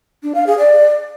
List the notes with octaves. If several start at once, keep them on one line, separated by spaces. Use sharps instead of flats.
D4
F5
G#4
D5